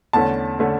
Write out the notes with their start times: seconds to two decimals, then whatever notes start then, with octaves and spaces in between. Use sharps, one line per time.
0.13 E2 D3 A3 C#4 A5
0.59 D3 A3 C#4